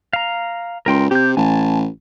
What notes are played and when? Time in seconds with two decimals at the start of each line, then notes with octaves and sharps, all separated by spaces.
0.13 F5 A#5
0.86 C#2 A#4 G5 C6
1.11 C3 G4 G6
1.37 A1 G#5 A5